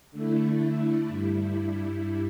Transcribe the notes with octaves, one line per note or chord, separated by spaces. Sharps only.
D3 A3 E4
G2 G3 E4